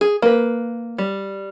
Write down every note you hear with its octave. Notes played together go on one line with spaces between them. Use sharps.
G#4
A#3 B4
G3